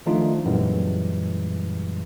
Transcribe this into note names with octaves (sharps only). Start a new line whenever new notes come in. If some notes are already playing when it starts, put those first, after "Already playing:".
D#3 F3 A3 D4 D#4 F4
F#2 A#2 E3 G3 G#3